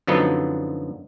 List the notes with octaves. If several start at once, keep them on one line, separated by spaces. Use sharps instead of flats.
F#2 D3 F3 F#3 B3 D#4